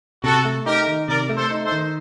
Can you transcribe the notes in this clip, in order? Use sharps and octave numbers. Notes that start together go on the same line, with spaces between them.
C3 F#4 A4
A3
D#4 G4 A#4
D#3
C3 A#4 D5
A3
A4 C5
D#4
A4 C5
D#3